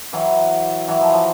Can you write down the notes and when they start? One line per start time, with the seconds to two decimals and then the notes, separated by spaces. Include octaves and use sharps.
0.13 E3 F#3
0.88 E3 F#3
1.01 F3
1.14 F3